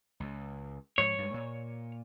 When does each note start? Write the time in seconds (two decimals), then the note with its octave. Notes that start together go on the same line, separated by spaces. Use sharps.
0.20 C#2
0.98 G#2 F3 C#5
1.18 G2 G#3
1.34 A#2